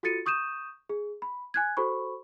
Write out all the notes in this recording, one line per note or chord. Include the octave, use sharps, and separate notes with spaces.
F4 F#4 A4 A6 C#7 D#7
C#6 D#6 G6 D#7 E7
G#4
B5
G#5 F#6 G#6
F#4 A4 C5 B5 C#6